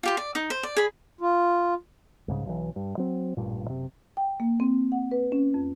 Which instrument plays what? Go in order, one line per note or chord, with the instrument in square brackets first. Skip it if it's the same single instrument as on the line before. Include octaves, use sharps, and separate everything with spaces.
[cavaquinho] F4 G4 C6
D5
D#4 D#6
C5
D5
G#4 B5
[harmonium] F4
[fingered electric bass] C2 G#2 C#3
B1 E3
G2
F#3 C4
A1 G2 A#2
F#1 C3
[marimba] G5
A#3
C4
F#5
B4
C#4
F2